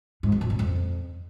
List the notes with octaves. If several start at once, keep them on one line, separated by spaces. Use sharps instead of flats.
G#2
F#2
A#2
C#3
F2